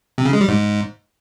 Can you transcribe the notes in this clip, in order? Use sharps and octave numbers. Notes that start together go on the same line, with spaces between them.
C3
C#3
G#3
G3
G#2